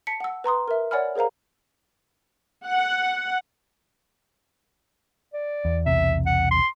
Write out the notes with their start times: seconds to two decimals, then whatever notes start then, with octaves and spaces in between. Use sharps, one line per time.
0.07 A5 B6 C#7
0.20 F#5 E6
0.44 B4 A#5 C6 D#6
0.68 A#4 E5
0.91 C#5 D5 F#5 G#5 B5 F6
1.16 G#4 A#4 C5 F5 A#5
2.66 F#5
5.34 D5
5.65 E2
5.86 B1 E2 C3 E5
6.26 F#5
6.51 C6